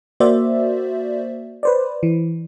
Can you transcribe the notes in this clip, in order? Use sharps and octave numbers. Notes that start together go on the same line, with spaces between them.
A#3 F#4 C5 D5 E5
B4 C5 D5
E3